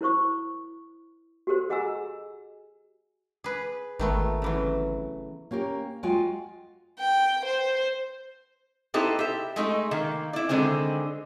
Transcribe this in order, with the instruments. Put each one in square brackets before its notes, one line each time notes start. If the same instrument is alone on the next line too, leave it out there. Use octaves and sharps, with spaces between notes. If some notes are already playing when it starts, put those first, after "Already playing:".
[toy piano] E4 A#4 C5 C#6 D#6
F#4 G4 A4 A#4 C5
G#4 D#5 F#5 G#5 A#5 E6
[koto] G#4 B4
[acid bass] G#1 [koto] D#3 A3 B3
[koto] C#3 E3 F#3
[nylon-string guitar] A#3 C#4 G4 A#4
G#3 F4 F#4 G5 G#5
[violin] G5
C5
[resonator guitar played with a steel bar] B3 D#4 E4 G4 A4 C5
G4 E5
G#3 A3 D#4
D#3 A#3
E4 D5
D3 D#3 G#3 C4